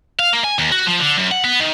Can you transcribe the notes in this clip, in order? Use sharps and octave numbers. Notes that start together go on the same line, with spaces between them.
F5
A#3
G#5
D#2
F#4
F3
D3
F#2
F#5
B3
D#3